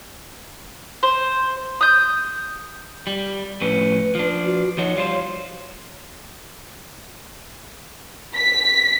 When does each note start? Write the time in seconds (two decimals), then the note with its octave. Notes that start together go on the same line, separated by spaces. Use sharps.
1.03 C5
1.81 D#6 G6
3.07 G3
3.61 F2 A2 C#4 B4
4.15 F3 D4
4.45 F#4
4.78 F3 D#4 F#4 C#5
4.96 G3 F4 C5
8.35 B6